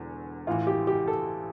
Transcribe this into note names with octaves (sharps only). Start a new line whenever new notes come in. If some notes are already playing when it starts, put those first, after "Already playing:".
Already playing: E1 E2 D3
A1 A2 E3 F4
G4
G4
A4